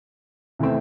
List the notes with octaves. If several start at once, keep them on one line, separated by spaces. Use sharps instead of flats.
C3 E3 A3 C4